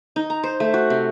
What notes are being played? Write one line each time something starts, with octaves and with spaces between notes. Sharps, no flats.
D#4
A#5
C5
A3
F#4
C3